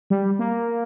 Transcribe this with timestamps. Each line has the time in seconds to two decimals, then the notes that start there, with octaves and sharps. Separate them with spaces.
0.10 G3
0.39 A#3